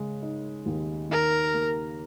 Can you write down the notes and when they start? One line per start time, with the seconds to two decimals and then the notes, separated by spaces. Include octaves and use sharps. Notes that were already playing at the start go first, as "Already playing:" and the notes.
Already playing: C#3 G#3
0.22 D#4
0.66 D#2
1.10 D#3 A#4
1.54 A#3